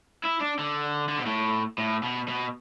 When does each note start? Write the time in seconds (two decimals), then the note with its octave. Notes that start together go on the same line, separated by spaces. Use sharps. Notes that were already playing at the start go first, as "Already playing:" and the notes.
0.25 E4
0.41 D4
0.59 D3
1.08 D3
1.18 B2
1.26 A2
1.78 A2
2.03 B2
2.28 B2